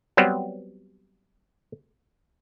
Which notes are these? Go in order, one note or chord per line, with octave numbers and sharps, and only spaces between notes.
F#3 G3 B3 C4